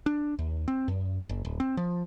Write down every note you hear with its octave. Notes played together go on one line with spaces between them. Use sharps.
D4
D#2
C4
F#2
F#1
D1
C4
F3